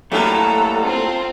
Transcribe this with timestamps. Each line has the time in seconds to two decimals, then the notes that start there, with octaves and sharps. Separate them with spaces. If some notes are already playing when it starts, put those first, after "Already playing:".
0.12 G2 F#3 G3 A3 A#3 E4 A4 A#5
0.81 C4 F4